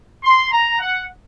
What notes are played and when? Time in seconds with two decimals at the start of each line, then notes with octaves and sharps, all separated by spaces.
0.23 C6
0.51 A#5
0.79 F#5